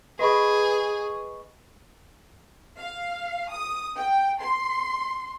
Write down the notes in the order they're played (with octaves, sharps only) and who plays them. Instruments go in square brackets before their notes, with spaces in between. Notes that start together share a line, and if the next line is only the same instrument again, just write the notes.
[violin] G#4 [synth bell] B4 C#6 [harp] D#5 B5 D#6
[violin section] F5
D#6
G5
C6